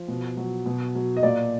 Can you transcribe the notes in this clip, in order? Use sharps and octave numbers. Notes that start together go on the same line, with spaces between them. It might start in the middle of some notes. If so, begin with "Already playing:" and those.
Already playing: F3
B2
F#3
B2
F#3
D#5
A#2 D5